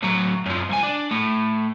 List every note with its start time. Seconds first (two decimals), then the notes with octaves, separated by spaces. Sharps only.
0.03 A2 F#3
0.46 F#2 F3
0.69 C2 G#5
0.83 D4
1.11 A2